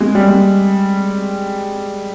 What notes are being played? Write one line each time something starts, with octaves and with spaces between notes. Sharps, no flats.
G#3
G3
G#3